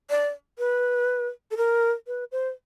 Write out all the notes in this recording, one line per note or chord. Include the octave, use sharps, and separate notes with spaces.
D5
B4
A4
A#4
B4
C5